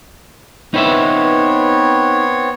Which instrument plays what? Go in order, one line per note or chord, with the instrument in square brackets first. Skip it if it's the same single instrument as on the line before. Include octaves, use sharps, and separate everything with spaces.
[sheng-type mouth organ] B3 C4 C#5 [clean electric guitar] D#4 B4 E5